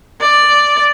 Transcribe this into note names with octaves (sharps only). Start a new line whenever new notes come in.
D5